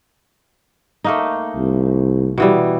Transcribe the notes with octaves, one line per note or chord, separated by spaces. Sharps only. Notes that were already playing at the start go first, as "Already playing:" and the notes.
A3 A#3 D#4
C2
B2 E3 G3